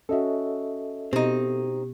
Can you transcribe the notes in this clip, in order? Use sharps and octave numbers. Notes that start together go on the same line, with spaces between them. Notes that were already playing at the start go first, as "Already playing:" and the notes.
C#4 F#4 A4 D#5 E5
B2 C4 D#4 G4